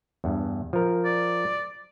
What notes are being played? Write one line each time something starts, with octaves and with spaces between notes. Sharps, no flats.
E2 G2
F3 A#4
D5